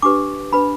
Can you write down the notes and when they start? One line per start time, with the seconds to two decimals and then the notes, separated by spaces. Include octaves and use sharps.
0.02 D4 G4 B4 D6
0.52 D4 B4 B5